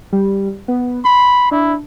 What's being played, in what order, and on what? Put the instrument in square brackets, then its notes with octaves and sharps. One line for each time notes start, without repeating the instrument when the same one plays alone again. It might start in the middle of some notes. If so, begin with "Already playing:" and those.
[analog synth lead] G3
B3
[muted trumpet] B5 [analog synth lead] C6
[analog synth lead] D4 [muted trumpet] E4